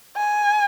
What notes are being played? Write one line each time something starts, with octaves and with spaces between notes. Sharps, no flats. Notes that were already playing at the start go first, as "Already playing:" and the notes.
G#5